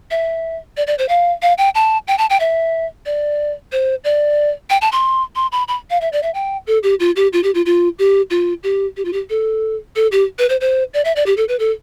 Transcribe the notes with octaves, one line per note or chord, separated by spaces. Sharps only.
E5
D5
D5
C5
F5
F5
G5
A5
G5
A5
G5
E5
D5
C5
D5
G5
A5
C6
C6
B5
B5
F5
E5
D5
E5
G5
A4
G4
F4
G4
F4
G4
F4
F4
G4
F4
G4
G4
F4
G4
A4
A4
G4
B4
C5
C5
D5
E5
D5
G4
A4
B4
A4